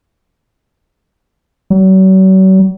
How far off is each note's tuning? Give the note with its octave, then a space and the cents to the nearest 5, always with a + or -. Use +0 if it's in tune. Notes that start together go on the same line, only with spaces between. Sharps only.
F#3 +40